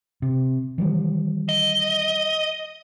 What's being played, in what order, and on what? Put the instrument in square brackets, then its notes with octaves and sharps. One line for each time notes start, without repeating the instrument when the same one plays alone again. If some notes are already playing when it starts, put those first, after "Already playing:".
[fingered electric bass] C3
D#3 E3 G3
[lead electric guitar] D#5